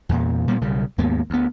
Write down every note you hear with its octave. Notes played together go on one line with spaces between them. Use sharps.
E2 A#2
A#2 G3 B3
B1 C#3 G3
D#2 G#2 A#3 B3
D2 B3